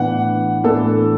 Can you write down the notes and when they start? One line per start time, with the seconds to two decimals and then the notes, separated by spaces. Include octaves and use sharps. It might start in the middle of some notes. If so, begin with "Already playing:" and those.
Already playing: A2 E3 B3 D4 F#5
0.64 A2 E3 B3 D4 A4